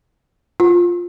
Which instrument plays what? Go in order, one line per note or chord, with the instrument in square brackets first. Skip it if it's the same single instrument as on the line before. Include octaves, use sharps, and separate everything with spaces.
[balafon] F4